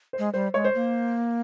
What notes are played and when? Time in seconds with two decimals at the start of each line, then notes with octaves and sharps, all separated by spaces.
0.13 C5
0.19 G#3
0.34 G3 C5
0.54 G#3 C#5
0.64 C5
0.75 A#3